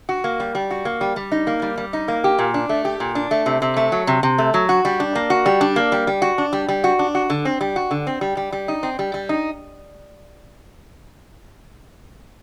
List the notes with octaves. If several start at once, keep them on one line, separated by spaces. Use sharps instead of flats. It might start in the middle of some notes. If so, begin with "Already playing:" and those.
F#4
A#3
G3
G3
F#4
A#3
G3
G3
D#4
A#3
G3
G3
D#4
A#3
G4
A#2
D4
A3
G4
A#2
D4
A3
C3
C3
A3
F#3
C3
C3
A3
F#3
F#4
G3
D4
A#3
F#4
G3
D4
A#3
G3
G3
F#4
D4
G3
G3
F#4
D4
F#4
D3
C4
G3
F#4
D3
C4
G3
G3
G3
D#4
C4
G3
G3
D#4